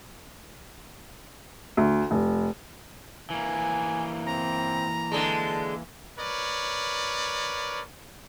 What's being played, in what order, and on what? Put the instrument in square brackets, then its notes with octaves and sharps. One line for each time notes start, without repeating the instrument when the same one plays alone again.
[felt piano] D2
F1
[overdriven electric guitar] E3 A#3 [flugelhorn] G#5
[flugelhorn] C4 [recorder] A#5
[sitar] D3 G#3 [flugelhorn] A5
[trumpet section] A#4 B4 C#5 D5